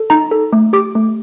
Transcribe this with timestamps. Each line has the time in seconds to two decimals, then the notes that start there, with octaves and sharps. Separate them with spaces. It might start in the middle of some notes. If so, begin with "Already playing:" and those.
Already playing: A4
0.10 D#4 A#5
0.31 A4
0.53 A3
0.73 G4 D6
0.95 A3